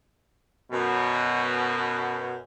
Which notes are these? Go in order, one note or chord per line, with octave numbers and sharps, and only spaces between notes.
F#2 B2